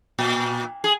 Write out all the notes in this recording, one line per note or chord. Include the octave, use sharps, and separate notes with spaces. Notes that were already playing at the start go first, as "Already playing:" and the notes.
A#2
G#4